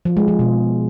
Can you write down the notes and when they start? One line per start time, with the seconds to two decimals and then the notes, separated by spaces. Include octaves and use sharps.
0.05 F3
0.17 G#3
0.28 F3
0.39 B2